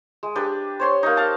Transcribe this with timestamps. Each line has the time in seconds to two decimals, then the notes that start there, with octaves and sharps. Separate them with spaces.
0.23 G#3
0.36 D4 G4 B4
0.80 C5 C#5 C6
1.03 A#3 D#4
1.17 F5 A5